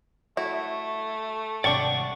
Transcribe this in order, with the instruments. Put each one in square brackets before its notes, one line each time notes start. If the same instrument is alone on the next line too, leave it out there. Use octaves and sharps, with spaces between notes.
[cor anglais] A3 [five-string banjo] E4 F#4
[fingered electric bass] G#1 C3 [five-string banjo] G3 D4 [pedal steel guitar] D5 F#5 C#6